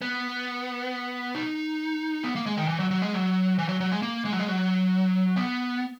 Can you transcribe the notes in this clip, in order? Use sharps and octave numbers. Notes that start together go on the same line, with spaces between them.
B3
D#4
B3
A#3
G#3
D#3
E3
F#3
F#3
G#3
F#3
E3
F#3
F#3
G#3
A#3
G#3
F#3
G#3
F#3
B3